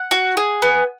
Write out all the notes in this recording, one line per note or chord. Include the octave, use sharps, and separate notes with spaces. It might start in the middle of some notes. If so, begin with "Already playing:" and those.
Already playing: F#5
F#4
G#4
B3